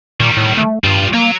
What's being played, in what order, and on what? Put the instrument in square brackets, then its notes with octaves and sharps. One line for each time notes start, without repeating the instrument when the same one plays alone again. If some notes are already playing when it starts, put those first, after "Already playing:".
[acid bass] A#2 [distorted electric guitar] D#3 G3
[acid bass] A2
A3
[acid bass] G2 [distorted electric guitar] G3 F4
[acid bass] A#3 [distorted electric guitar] C#5 A#5